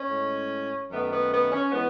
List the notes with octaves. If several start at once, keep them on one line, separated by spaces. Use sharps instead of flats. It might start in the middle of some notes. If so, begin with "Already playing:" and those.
Already playing: C#4
A2 G#3
F#2 D#3 A3 B3
B3
B3
C#4
E3 G#3 B3